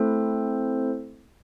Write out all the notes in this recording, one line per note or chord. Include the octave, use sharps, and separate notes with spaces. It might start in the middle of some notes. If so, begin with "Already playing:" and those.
Already playing: A3 C4 E4 A4 C5